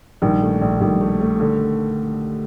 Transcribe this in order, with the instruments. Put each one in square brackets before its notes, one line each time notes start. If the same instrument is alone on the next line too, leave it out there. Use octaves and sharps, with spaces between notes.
[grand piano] A#1 [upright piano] D#3 G3
[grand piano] A3
A#1
[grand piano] A#1 [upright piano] D#3 G3
[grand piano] A3
A3
D3